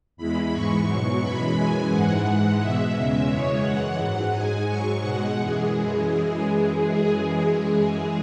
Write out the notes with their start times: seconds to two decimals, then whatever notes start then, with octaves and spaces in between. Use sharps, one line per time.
0.17 E2 E3 G#3 B5
0.52 G#2 E3 G#3 C#6
0.87 B2 F#3
1.21 F#2 E3 G#3 B5
1.55 F#2 E3 G#3 G#5
1.90 G#2 E3 G#3 F#5
2.25 G#2 E3 G#3
2.59 B2 G#3 E5
2.94 E2 C#3 G#3
3.28 F#2 C#3 E3 G#3 C#5
3.62 F#2 E3 G#3 F#5
3.98 G#2 F#3
4.31 G#2 G#3 G#5
4.66 G#2 F#3 C#6
5.01 B2 G#3 F#5
5.35 F#2 E3 G#3 G#4